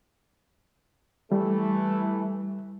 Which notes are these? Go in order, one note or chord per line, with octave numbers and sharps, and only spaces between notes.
E3 G3 A3